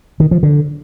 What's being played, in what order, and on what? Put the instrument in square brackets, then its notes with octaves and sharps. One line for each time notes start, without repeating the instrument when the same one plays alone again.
[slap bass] D#3
F3
D3